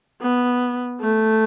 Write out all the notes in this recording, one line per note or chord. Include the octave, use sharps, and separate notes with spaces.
B3
A3